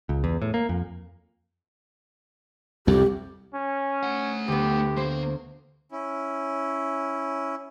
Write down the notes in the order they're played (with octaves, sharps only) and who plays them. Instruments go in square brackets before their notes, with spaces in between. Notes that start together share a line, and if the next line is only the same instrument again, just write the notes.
[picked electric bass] C#2
E2
A2
A#3
F2
[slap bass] C2 F2 [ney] G4
[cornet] C#4
[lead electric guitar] A3 F#5
[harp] D2 B3 [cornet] G4
[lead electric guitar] A#3 [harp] C5
[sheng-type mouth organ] C#4 E4